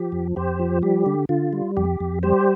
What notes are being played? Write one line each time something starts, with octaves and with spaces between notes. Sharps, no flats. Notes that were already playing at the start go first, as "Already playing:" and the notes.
Already playing: F3 G4
F2
F2 G4 C5
F3
G3 G4
D3
D3 F4
G3
F2 G4
F2
G3 G4 C5